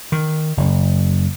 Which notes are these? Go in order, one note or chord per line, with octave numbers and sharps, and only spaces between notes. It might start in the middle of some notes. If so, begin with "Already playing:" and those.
D#3
F#1